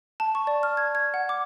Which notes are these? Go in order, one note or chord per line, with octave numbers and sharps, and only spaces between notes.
A5
C#6
D5
F6
G#6
G#6
F#5
D6